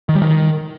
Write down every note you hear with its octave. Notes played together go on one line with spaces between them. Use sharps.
D#3
G3
D#3